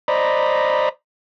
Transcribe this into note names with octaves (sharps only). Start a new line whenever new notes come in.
C5 D5 D#5 A#5 B5